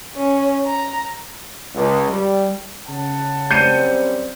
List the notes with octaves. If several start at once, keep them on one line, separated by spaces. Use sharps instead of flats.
C#4
A#5
C#2
G3
C#3 F#5 A5
F#2 G3 C4 G6 C#7 D#7